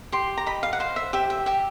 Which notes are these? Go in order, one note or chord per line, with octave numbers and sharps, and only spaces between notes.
G4 C6
A#5
D#5 B5
F5
F#5
C5 F5
E5
G4 E5
E5
G4 E5